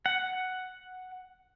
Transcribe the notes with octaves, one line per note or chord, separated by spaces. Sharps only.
F#5